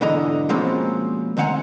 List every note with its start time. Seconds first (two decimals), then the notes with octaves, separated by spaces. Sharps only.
0.01 B1 G#2 D3 E3 D#5 A#5
0.49 B2 F3 G#3 A#3 C4 C#4
1.37 D2 D#3 C4 F#5 G#5 A#5